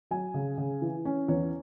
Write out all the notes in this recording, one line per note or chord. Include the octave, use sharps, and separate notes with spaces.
F#3 G#5
C#3
C#3
E3
C#4
E2 C#5